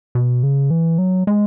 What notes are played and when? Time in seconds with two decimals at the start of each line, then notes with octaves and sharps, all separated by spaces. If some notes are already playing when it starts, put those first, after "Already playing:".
0.15 B2
0.43 C#3
0.71 E3
0.98 F#3
1.27 G#3